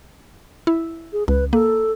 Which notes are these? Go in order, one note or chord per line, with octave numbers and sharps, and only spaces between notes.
E4
G#4
C#2 B4
A#3 A4